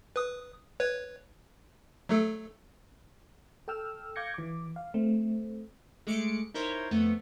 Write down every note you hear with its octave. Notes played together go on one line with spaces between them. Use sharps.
B4 D#6
B4 C#5
F#3 A3 A4
A4 G5 E6 F6
F5 D6 G6 G#6 A#6 C#7
E3 D6
F5
A3 C4
G#3 A3 D6 C#7 D7
D#4 E4 A#4 C5 C#5
F2 A3 B3